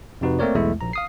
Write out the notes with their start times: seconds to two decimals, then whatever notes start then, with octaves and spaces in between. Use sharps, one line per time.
0.21 F2 C3 D#4 F#4 B4
0.39 A3 A#3 C4 A#4 C#5 D5
0.54 B1 E2 G#3 A3 E4 E5
0.81 A#1 A#5
0.93 F5 D#6 C7